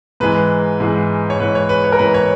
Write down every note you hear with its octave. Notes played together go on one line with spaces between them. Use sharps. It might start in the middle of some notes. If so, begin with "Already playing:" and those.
G#2 E3 G#3 B4
G#2 E3 G#3
C#5
G#2 E3 G#3 B4
C#5
B4
C#5
A#4
G#2 E3 G#3 B4
C#5